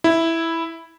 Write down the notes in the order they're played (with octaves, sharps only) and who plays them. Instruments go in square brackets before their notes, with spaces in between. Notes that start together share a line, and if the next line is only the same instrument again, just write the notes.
[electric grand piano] E4